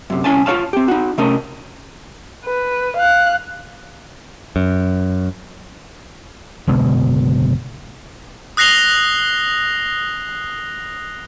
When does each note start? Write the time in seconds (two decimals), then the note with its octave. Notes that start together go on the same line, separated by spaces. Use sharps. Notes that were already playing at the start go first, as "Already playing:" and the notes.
0.10 F#2 C3
0.24 C2 C#3 C#4 G#5 A5
0.46 F4 F#4 C#5 F5 A5
0.73 C4 G4
0.88 D#4 F#4
1.18 C3 A3 C#4 A#4 D#5 A5
2.45 B4
2.97 F5 F#6
4.56 F#2
6.67 F#1 B2 D3 G#3
8.57 D#6 F#6 A#6 C7 F7 G7